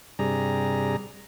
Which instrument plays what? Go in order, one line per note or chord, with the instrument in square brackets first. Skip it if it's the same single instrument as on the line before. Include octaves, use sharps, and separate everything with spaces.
[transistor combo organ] G2 C3 G3 G#4 A#5